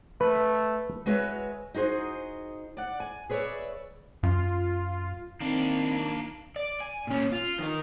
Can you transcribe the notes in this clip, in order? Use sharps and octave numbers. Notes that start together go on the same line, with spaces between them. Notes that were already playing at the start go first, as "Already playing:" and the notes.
A3 B4
G#3 F#4 B4 C#5 E5
D#4 F#4 G#4 C5 D#5
D5 F#5
G#5
G#4 B4 C#5 D5 E5
F#2 F4
D#3 A#3 C4 D4
D5
G#5
A#2 C#4
F4
D#3 A#4